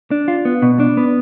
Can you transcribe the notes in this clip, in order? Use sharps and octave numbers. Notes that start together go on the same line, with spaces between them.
D4
F4
B3
B2
D4
B3